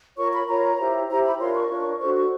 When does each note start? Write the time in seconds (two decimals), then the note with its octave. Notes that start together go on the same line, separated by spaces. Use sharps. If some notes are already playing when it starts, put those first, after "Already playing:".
0.17 F4 A#4 C#5 C#6
0.33 B5
0.48 F4 A#4 C#5 A#5
0.78 E4 G4 C5
1.09 E4 G4 C5 A#5
1.24 B5
1.39 D4 F4 A#4 C#5 C6
1.54 C#6
1.69 D4 F4 A#4 C#5
1.99 D4 F#4 A4 C5 C#6
2.15 C#6